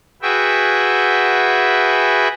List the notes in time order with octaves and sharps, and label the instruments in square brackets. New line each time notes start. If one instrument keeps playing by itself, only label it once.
[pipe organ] F#4 G#4 B4 E5 G5